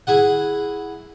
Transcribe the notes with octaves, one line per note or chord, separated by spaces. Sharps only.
E4 G#4 F#5